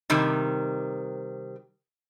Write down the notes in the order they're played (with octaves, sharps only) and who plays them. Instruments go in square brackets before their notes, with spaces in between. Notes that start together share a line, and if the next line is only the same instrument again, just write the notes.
[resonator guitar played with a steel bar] C3 D#3 G3